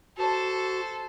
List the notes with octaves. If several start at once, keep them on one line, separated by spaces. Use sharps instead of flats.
F#4 A4 C5 A5